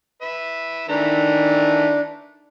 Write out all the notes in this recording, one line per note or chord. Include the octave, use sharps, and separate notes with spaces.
B4 E5
D#3 E3 A3 D4 A#5